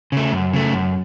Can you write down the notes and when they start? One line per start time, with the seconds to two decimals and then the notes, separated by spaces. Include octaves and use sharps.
0.12 C#3 A3
0.32 F#2
0.53 C#3 A3
0.73 F#2